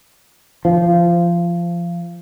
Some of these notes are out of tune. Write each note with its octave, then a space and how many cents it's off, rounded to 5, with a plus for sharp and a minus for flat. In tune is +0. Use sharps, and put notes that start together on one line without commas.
F3 -20